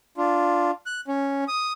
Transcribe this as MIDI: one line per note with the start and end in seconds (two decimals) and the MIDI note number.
0.17 0.71 62
0.17 0.71 65
0.86 1.01 90
1.08 1.44 61
1.48 1.73 87